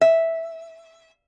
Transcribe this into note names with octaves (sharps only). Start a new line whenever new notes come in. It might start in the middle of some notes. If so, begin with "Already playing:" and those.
E5